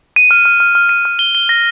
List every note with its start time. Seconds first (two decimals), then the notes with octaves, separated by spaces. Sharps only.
0.16 D#7
0.31 F6
0.45 F6
0.60 F6
0.75 F6
0.89 D#7
1.05 F6
1.19 G7
1.35 G7
1.49 A#6